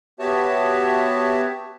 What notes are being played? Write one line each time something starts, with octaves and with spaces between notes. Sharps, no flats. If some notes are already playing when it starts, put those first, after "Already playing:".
B3 F#4 G4 C#5 E5 A5